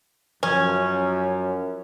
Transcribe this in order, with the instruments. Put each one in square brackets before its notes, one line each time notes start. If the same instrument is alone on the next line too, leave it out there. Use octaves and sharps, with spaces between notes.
[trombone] F#2 [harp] F3 G#6 [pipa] C#4